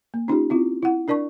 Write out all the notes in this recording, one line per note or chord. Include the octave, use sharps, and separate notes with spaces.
A#3
C#4 D#4 F4 G4
C4 E4 F4
E4 F#5
D4 A#4 D5 A5 C#6